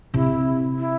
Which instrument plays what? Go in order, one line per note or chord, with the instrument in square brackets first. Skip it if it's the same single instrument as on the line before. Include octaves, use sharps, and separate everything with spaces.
[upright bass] C3 [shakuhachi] E4
[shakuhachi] E4